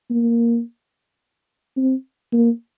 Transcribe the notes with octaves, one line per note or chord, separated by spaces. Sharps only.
A#3
C4
A#3